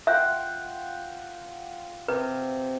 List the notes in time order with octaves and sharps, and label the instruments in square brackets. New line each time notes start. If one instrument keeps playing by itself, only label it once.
[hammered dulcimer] F4 F#5 G5 [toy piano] E5
[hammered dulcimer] C3 [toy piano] B4